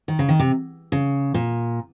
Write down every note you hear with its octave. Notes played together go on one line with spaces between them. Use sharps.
D#3
C#3
D#3
C3
C#3
A#2